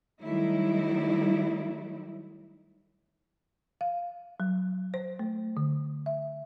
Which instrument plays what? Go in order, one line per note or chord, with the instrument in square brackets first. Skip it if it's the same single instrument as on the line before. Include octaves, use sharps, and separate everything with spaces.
[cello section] D#3 F#3 G3 A3 D#4 E4
[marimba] F5
F#3
C5
A3
D3
E5